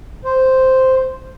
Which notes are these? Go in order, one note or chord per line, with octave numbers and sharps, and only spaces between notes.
C5